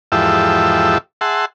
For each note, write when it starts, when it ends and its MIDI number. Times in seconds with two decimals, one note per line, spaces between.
0.12 0.98 40
0.12 0.98 44
0.12 0.98 53
0.12 0.98 67
0.12 0.98 69
0.12 0.98 76
1.21 1.45 68
1.21 1.45 76
1.21 1.45 78
1.21 1.45 81
1.21 1.45 84